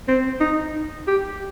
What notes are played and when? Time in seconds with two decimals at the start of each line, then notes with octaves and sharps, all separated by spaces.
0.08 C4
0.40 D#4
1.07 G4